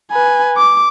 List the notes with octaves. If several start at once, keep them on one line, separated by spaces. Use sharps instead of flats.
B4 G#5
D6